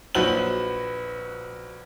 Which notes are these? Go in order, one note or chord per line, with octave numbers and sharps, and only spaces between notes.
A#1 F#3 F#4 B4 C5 F#7